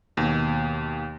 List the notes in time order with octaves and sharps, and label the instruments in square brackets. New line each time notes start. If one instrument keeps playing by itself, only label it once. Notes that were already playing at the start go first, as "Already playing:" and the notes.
[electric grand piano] D#2 B2